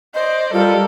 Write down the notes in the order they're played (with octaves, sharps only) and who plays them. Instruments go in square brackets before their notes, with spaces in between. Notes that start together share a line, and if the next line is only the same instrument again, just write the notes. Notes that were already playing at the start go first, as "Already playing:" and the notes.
[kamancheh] C5 D5 [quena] D#5
[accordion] G3 [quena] F4 [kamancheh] A4 A#4